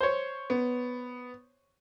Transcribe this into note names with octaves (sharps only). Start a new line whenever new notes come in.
C5 C#5
B3